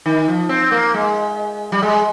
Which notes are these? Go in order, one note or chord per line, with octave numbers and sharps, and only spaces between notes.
D#3
F3
C4
A#3
G#3
G3
G#3